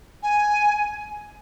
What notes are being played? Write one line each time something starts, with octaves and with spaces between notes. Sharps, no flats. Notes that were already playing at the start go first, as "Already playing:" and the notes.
G#5